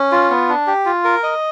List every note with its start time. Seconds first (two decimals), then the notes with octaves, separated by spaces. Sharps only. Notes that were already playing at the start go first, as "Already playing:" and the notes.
Already playing: C#4
0.12 F4
0.30 B3
0.49 D4
0.67 G4
0.86 F4
1.04 A#4
1.23 D#5